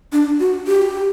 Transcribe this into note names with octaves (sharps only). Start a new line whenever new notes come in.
D4
F#4
G4